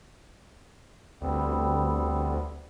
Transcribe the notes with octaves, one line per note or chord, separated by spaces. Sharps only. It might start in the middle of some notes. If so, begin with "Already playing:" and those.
D2 G3 B3 C4